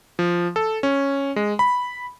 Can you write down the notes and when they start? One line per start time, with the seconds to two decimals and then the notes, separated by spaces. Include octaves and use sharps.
0.19 F3
0.56 A4
0.83 C#4
1.36 G#3
1.59 B5